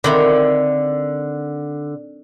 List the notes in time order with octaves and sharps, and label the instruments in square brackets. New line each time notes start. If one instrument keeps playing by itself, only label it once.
[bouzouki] D3 [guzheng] D#3 C4 E4